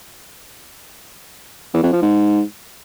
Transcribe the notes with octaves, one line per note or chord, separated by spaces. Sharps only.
E2
F2
F3
G#2